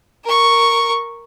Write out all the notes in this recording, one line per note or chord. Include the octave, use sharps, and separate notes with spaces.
A#4 C#6